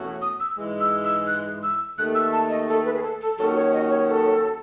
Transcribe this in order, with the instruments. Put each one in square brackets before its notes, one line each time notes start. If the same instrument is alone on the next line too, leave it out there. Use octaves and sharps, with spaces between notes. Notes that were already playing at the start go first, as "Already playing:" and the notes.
Already playing: [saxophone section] E2 B2 A3 C#4 F#4
[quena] D#6
E6
[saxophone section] G#2 E3 G#3
[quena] E6
E6
F#6
E6
[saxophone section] D#2 D#3 A3 [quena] F#6
[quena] E6
A5
D#5
A4
B4
G#4
A4
A4
[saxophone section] D#2 D#3 F#3 C#4 F#4 [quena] A4
[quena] C#5
D#5
C#5
A4